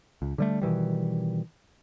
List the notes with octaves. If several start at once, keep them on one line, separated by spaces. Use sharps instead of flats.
C#2
D3 G3 A3
B2 D#3 E3 G3